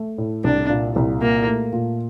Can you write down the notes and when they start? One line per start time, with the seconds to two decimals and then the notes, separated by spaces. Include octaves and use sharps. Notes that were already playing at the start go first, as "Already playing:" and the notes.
Already playing: A3
0.18 A2
0.44 C2 D4
0.69 A#2
0.96 C2
1.21 A#2 A#3
1.47 A3
1.73 A#2